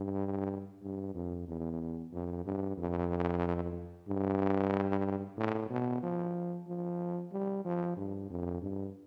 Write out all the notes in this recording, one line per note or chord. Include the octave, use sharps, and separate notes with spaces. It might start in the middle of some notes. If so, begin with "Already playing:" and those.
Already playing: G2
G2
F2
E2
F2
G2
F2
G2
A2
B2
F3
F3
G3
F3
G2
F2
G2